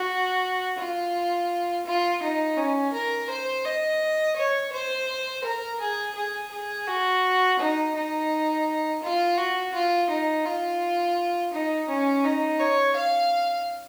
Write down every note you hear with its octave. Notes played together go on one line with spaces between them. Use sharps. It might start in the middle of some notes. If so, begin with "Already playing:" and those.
Already playing: F#4
F4
F4
D#4
C#4
A#4
C5
D#5
C#5
C5
A#4
G#4
G#4
G#4
F#4
D#4
D#4
F4
F#4
F4
D#4
F4
D#4
C#4
D#4
C#5
F5